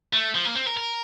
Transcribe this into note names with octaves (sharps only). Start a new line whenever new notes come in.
A3
F3
A#3
C4
A#4
A#4